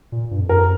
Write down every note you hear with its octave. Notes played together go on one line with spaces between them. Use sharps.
A#2
G2
F2
F#2 A#4